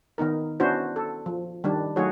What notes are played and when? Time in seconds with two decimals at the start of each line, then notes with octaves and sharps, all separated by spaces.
0.18 D#3 B3 D#4 A#4
0.60 B3 C#4 D4 E4 F#4 C5
0.96 A4
1.26 F3
1.64 D#3 G3 D4
1.96 F#3 A3 D#4 F#4 G#4 C#5